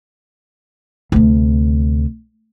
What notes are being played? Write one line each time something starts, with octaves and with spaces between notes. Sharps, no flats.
D2 C3